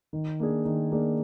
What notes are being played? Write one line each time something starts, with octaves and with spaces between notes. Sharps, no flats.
D#3
A#3 D4 G#4
D#3
A#3 D4 G#4